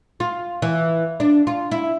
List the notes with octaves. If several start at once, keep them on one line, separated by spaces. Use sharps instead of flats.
F4
E3
D4
F4
E4